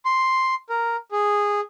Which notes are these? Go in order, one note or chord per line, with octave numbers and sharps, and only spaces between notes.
C6
A#4
G#4